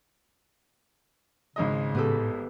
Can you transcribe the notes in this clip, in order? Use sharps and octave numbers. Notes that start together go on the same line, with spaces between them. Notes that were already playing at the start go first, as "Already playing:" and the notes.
G#1 C#3 G#3 D#5
A2 B3 G4 A4